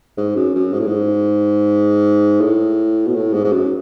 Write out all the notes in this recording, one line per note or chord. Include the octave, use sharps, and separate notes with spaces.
G#2
F#2
F#2
G#2
A2
G#2
A2
B2
A2
G#2
G#2
F#2